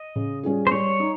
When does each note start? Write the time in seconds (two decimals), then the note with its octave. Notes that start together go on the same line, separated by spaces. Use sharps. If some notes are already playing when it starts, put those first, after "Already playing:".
Already playing: D#5
0.16 C#3
0.43 G3 C#4 F4 G#4
0.67 C5
0.72 G3 C#5
1.00 D#4